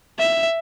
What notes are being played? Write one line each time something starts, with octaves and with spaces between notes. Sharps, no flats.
E5